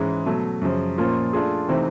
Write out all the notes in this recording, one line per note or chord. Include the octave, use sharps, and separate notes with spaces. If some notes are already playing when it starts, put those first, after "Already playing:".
Already playing: G#2 E3 G#3 C#4
B2 F#3 A3
F#2 C#3 F3
A#2 F3 A#3 C#4 F4
A3 D4 F4 G#4
C3 E3 A3 C4 D#4